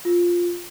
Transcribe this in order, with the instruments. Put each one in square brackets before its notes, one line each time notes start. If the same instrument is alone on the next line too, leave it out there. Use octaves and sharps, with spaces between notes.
[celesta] F4